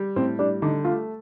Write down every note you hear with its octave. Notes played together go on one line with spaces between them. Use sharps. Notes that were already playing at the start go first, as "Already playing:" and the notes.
Already playing: G3
A2 C4
G3 D4
D3 D#4
A3 F4